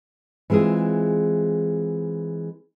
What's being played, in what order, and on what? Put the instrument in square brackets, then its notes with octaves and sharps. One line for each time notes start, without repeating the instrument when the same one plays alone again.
[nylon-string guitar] E3 G#3 C4 F4 G#4